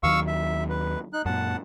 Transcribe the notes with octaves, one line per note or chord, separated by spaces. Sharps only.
D#2 D#3 F#3 F5 C#6 E6
E5
B4
D#4 F#6
F#2 A#2 F#5 A5